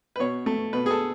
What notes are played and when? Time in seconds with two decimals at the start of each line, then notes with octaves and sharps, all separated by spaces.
0.16 B4
0.19 B2 C#5
0.46 A3
0.73 B2 B4
0.86 G#4
0.91 A4